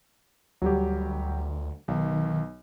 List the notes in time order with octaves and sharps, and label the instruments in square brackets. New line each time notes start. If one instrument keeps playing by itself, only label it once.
[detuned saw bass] D2 [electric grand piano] F#3 G3 G4
[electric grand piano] B1 [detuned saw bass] D#3